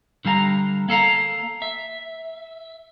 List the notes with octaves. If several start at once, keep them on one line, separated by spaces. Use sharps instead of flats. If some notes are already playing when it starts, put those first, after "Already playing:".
D3 G3 F5 A5 A#5
A#3 A4 F5 A#5
E5